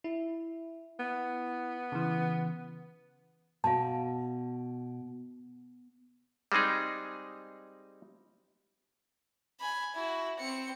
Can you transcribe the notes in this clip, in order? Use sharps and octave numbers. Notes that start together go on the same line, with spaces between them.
E4
B3
C#3 E3
B2 F5 A5
G3 G#3 C4 D#4 G#4
G#5 B5
E4 F#4
C4 C#7